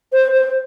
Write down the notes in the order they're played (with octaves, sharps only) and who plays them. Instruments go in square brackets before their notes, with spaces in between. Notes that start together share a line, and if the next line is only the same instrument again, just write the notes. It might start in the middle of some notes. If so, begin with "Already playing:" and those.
[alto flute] C5
C5